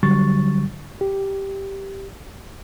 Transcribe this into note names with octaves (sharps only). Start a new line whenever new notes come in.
D3 F#3 G3 C#6 A6
G4